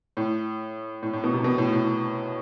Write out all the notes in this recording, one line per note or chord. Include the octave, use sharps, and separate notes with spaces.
A2
A2
A2
B2
C3
B2
A2
A2